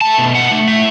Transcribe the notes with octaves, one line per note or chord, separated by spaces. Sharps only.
A3 A5
B2
A3 F#5
A3
A2 E5